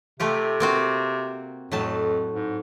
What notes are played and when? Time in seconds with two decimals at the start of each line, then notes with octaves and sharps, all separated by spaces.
0.20 C3 A3 F4 G4
0.60 A#3 C4 F#4
1.72 F2 A2 F#3 A5
2.34 G#2